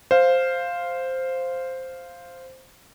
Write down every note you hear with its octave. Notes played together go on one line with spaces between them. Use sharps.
C5 F5